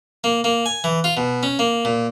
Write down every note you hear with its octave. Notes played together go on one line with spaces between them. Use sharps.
A#3
A#3
G#5
E3
F4
B2
C#4
A#3
A#2